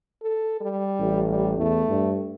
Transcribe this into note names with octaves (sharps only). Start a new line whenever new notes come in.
A4
G3
A1
G3
E2 A3
G2